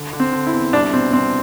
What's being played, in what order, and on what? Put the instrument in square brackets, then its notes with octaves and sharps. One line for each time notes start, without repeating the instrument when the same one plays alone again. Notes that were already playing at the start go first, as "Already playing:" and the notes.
Already playing: [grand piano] D3
D3
C4
D3
E4
E2
C2 D4
B2 C4
C2 C4